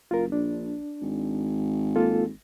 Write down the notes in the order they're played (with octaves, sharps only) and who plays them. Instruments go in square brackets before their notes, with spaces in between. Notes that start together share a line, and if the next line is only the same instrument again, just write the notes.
[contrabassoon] F#1 [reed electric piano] F4 A#4
[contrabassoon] A#1 [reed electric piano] D4
[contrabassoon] G#1
[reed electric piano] A#3 F4 A4